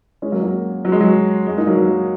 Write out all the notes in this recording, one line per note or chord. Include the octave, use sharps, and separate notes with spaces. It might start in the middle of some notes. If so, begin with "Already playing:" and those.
G#3 C#4
F#3 A#3
F#3 A#3
F#3
G#3
F#3
G#3
A#3 D#4
F#3 A#3
F#3